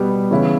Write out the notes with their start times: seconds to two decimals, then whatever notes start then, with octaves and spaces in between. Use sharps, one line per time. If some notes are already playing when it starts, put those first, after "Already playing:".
Already playing: B2 G3 B3
0.31 C#3 E3 B3 E4